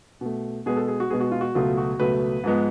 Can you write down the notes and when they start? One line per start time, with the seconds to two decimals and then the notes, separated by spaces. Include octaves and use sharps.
0.21 B2 A3
0.66 B2 G#3 B3 G#4
0.77 A4
0.88 G#4
1.00 F#4
1.10 B2 G#3 B3 G#4
1.20 F#4
1.31 F4
1.41 F#4
1.55 C#2 B2 F#3 A3 F4
1.77 F#4
2.00 C#2 B2 F#3 A3 B4
2.44 G#2 F3 G#3 B3